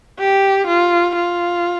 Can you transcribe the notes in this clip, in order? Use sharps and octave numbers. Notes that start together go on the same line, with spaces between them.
G4
F4
F4